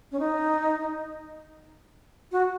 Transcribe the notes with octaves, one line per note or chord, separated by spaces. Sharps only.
C#4
D#4
F#4